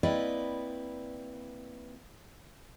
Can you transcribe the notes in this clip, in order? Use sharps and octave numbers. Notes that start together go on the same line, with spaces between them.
A#3 C4 E4 B4 D5 D#5